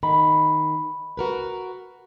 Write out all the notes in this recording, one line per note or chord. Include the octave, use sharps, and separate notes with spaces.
D#3 B5
F#4 A#4 B4